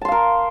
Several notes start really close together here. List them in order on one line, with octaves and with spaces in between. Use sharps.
A5 C6 F5 A#4